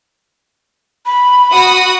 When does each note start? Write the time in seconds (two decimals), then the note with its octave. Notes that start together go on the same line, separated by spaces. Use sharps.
1.06 B5
1.52 F#4 F#5 D#6